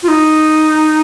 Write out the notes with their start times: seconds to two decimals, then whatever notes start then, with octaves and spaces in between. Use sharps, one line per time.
0.03 F4
0.08 D#4